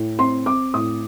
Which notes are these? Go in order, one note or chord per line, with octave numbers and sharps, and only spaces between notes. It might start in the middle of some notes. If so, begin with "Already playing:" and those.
Already playing: A2
C4 C6
C4 D6
A2 D#6